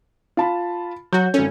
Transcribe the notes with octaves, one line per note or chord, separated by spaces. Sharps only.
F4 A5 B5
F#3 F#4 G6
G#1 C#4 A4